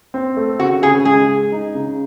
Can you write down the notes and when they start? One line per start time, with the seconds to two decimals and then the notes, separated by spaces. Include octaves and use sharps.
0.14 C4
0.37 A3
0.60 C#3 F#4
0.82 C#3 G#4
1.05 G#3 G#4
1.28 G#3
1.52 D#4
1.75 C#3